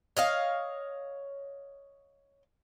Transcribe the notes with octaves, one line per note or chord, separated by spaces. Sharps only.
C#5 D#5 F5